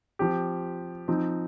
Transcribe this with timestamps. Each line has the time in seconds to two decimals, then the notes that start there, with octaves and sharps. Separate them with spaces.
0.19 F3 C4 G4
1.08 F3 C4 D#4